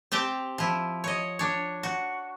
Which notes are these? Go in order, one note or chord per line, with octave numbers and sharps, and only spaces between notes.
C4 G4 G5 A5
F3 E4
C#5 D#5
D4 C#5
F#4